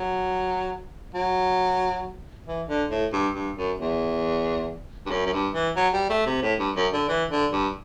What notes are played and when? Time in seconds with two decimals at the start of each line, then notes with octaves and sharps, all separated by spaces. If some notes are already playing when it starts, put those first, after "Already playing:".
Already playing: F#3
1.14 F#3
2.46 E3
2.69 D3
2.91 A2
3.13 G2
3.35 G2
3.56 F#2
3.79 E2
5.06 G2
5.11 F#2
5.26 F#2
5.33 G2
5.54 E3
5.76 F#3
5.93 G3
6.10 A3
6.26 C3
6.42 A2
6.59 G2
6.76 F#2
6.93 D3
7.09 E3
7.31 D3
7.52 G2